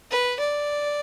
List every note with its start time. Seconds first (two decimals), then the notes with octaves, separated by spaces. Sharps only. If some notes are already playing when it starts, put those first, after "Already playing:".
0.11 B4
0.40 D5